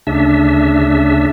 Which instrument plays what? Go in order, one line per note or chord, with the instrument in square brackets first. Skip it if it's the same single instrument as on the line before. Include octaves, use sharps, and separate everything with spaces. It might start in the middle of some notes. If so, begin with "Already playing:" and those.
[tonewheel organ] D2 C#3 D4 E5